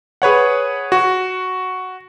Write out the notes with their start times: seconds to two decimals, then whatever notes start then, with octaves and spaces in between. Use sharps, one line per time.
0.22 G#4 B4 C#5 F#5
0.92 F#4